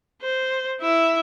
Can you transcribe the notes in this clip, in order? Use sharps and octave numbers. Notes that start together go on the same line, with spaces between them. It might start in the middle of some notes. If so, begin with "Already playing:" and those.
C5
E4 E5